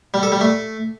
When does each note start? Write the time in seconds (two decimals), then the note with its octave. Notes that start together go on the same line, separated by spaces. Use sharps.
0.14 G3
0.23 A4
0.32 G3
0.41 A3